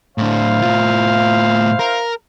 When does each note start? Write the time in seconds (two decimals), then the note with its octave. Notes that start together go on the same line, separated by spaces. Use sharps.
0.18 A2 D4 E4 C5 F5
0.62 A2 F4
1.79 A#4